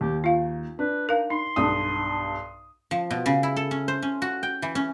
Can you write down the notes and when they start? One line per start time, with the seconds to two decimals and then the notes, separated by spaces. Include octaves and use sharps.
0.01 D#2 G4
0.24 D#4 F4 F5
0.79 D4 B4
1.09 D#4 A#4 F5
1.30 D#4 C6
1.56 B1 G2 D#6
2.91 F3
3.11 B2
3.26 C#3
3.43 E4
3.56 A4
3.71 C#4
3.88 C5
4.02 C#4
4.22 F#4
4.43 G5
4.62 E3
4.75 C#4